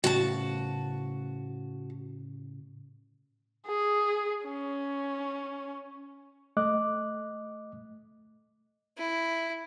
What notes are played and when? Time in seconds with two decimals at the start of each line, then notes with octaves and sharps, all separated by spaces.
0.04 A2 C#3 F#4 A5
3.67 G#4
4.45 C#4
6.57 A3 D#5 D6 F#6
8.98 E4